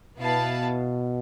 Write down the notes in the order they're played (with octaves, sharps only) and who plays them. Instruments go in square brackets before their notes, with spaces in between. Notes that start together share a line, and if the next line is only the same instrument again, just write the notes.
[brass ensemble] B2 [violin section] B3 E4 B4 F5 A5